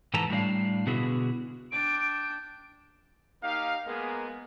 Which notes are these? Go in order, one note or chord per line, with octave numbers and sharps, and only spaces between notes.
G#2 E3 A4 B4 A5 A#5
A2 G3 D4 F5
B2 D3 B3 E4 F#4 G#4
D4 G5 D7
A#3 D#4 G4 F5
G#3 A#3 B3 G#4 A#4